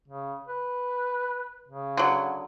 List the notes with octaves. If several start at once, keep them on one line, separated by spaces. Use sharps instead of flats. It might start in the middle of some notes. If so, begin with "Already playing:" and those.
C#3
B4
C#3
D3 F#3